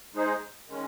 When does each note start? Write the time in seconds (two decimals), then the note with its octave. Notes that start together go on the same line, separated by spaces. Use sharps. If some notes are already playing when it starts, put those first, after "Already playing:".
0.14 G#3 D#4 G#4 C5
0.68 D#3 G#3 C#4